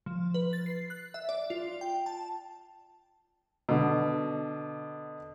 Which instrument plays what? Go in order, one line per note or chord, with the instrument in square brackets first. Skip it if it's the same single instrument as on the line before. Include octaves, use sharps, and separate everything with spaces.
[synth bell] F3
B4
A6
C7
F#6
E5
D5
F4
G5
A5
[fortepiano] B2 D3